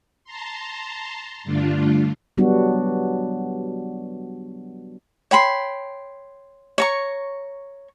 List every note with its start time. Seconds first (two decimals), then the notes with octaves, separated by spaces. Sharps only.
0.24 A5 A#5 C6
1.44 G2 D3 A3 D4 F4
2.38 F#3 G3 B3 D4 F#4
5.31 C#5 G5 B5 C6
6.78 C#5 A#5 C#6